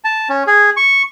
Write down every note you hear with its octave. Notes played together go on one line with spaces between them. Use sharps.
A5
C#4
G#4
C#6